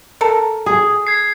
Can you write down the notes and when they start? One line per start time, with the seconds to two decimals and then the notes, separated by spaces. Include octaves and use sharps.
0.21 A4 A#4
0.66 G#4
1.07 G#6 C7